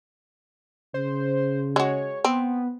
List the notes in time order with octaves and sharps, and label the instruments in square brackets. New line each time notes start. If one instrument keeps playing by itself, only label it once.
[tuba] C#3 [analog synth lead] C5
[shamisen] G#3 F#4 [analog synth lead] C#5
[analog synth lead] B3 [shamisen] C4